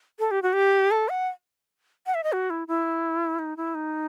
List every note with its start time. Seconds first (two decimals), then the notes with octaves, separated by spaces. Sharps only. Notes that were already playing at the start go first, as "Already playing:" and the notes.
0.19 A4
0.31 G4
0.42 F#4
0.53 G4
0.91 A4
1.09 F#5
2.06 F#5
2.15 E5
2.23 D#5
2.32 F#4
2.50 E4
2.68 E4
3.39 D#4
3.57 E4
3.75 D#4